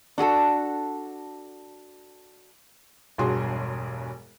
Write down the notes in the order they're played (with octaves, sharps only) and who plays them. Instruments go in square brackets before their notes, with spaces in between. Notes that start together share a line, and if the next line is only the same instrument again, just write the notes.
[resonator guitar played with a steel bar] D4 F#4 G#4 A4
[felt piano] E1 B1 G2 F#4 G#4 C6